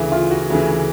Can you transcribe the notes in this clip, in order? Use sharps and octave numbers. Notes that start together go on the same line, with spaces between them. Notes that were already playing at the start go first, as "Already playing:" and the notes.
Already playing: D2 C#3 E3
F4
F#4
D2 C#3 E3